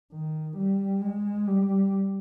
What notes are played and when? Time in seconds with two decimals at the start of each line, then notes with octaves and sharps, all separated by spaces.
0.13 D#3
0.57 G3
1.02 G#3
1.47 G3